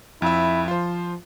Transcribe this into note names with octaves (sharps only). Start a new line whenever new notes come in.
F2 E4 E5
F3 F4 C5